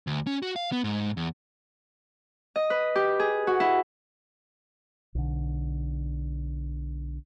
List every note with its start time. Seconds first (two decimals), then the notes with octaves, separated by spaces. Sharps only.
0.07 D2
0.27 C#4
0.42 F#4
0.56 F5
0.72 B3
0.84 G#2
1.17 E2
2.56 D#5
2.70 B4
2.95 G4
3.20 G#4
3.47 F#4
3.60 E4
5.15 B1 D3